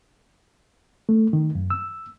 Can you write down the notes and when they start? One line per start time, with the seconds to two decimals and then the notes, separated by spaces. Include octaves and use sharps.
1.09 A3
1.33 D#3
1.55 F#2
1.70 E6